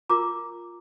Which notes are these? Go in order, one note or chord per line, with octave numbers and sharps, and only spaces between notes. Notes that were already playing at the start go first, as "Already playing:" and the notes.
F4 A#4 A#5 D6